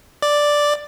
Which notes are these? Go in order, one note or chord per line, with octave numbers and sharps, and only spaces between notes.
D5